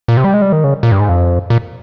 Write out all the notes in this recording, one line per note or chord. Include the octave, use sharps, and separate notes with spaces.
A#2
C3
G3
G#3
G3
D#3
C#3
A#2
G2
G#2
F2
A#2